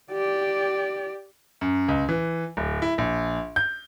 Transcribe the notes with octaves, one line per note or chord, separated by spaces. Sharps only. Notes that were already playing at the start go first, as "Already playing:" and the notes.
G4 D5
F#2
C#2
E3
D1
E4
A#1
G6